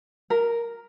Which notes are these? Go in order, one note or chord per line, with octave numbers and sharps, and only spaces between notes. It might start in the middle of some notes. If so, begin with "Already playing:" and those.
A#4